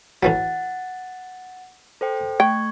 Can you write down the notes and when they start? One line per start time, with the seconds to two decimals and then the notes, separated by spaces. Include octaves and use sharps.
0.23 A2 E3 F#3 F#5 A6
2.01 A4 C5 G5
2.40 A3 G5 C#6 G#6